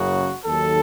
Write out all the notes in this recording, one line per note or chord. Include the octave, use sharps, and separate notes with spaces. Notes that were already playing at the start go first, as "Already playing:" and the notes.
Already playing: F#1 F#2 C#3 F#3 F#4
D#2 D#3 F#3 A4